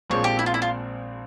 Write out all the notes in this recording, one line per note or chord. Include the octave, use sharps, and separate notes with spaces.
A#1 A#2 F3 G#3 C4 C#5
G4
E4
F4
E4
F4